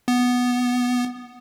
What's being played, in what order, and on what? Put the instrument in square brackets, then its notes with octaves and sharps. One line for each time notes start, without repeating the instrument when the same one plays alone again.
[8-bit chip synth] B3